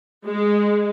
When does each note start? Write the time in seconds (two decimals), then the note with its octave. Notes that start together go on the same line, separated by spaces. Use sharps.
0.25 G#3